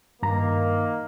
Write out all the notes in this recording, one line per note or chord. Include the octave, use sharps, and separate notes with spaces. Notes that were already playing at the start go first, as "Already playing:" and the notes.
G2 D#3 A#3 A#5